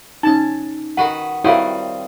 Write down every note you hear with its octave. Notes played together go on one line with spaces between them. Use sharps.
C#4 D#4 A5
D#3 F#4 B4 F#5
D#3 G3 C4 E4 F#4 C#5 F5 D#6